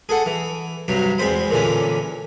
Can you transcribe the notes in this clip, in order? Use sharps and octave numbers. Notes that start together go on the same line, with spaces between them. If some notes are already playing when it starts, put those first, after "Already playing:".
G#4 A4 F#5
E3
G2 C3 F#3
E2 G#3 C4 C5 B5
A#2 D3 E3 C#4